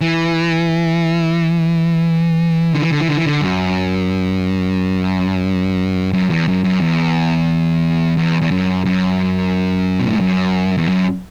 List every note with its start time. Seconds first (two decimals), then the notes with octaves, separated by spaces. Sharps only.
0.01 E3
2.74 D3
2.82 E3
2.91 D3
3.01 E3
3.08 D3
3.17 E3
3.26 D3
3.41 F#2
6.14 F#2
6.30 E2
6.48 F#2
6.64 F#2
6.81 E2
8.17 E2
8.41 E2
8.51 F#2
8.85 F#2
10.00 B2
10.07 A2
10.14 G#2
10.21 F#2
10.78 E2
10.89 F#2